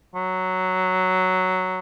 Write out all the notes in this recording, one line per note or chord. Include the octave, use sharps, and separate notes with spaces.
F#3